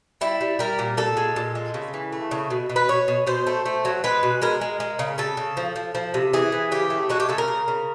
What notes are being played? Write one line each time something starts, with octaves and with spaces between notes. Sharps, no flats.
G3 E4
G3
G3 A#4
A#2
A#2 A4
G#3
A#2
G#3
C#3
E3
A3
C#3
B2
B2
B4
B2 C#5
B2
B2 C5
A3
A3
F#3
G#3 B4
B2
G#3 A#4
G#3
G#3
C#3
C#3 A4
C#3
F3
F3
F3
C3
E3 G#4
E3
C#3 G4
A3
G#3 F#4
G4
C#3 A4
A#4
C#3
C#3